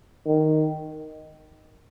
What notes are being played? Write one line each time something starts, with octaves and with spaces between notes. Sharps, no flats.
D#3